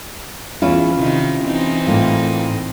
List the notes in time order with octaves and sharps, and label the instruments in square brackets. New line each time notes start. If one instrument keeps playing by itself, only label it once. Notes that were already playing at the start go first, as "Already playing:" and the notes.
[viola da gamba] E2 [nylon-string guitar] C#4 E4 F4
[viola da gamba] C3 D#3 D#4
E3 C4 D#4
[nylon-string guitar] A2 A#3 F4